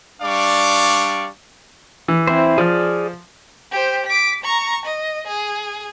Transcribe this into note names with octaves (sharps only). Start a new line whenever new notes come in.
G3 D4 D5 F5 C#6 D6
E3
C4 E4 C5
F3 G#4 D5 F6
G4 C5
D6 B6
A#5 C#6
D#5
G#4